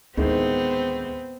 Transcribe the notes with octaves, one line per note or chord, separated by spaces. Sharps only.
D2 A2 D#3 G#3 B3 C4